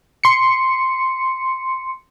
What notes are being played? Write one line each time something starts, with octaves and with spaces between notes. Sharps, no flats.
C6 C#7